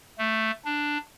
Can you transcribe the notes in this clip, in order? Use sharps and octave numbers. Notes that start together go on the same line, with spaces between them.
A3
D4